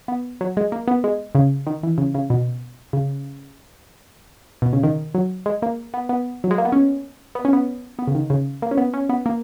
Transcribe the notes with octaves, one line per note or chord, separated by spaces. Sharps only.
B3
F#3
G#3
A#3
B3
G#3
C#3
D#3
E3
C#3
C#3
B2
C#3
B2
C#3
D#3
F#3
G#3
A#3
B3
B3
F#3
G#3
A#3
B3
C#4
B3
C#4
B3
B3
C#3
D#3
C#3
A#3
C#4
B3
C#4
B3
A#3